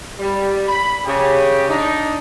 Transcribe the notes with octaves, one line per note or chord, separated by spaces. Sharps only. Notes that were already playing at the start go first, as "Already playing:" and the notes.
G3
B5
C#3 G4
D4 D#4